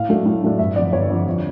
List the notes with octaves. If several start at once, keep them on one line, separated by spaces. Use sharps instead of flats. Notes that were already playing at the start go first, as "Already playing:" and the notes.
Already playing: A2 F5
F#3 A3 D4
A2
F#3 A3 D4
G1 E5
F2 D3 D5
G1 C#5
F2 D3
F2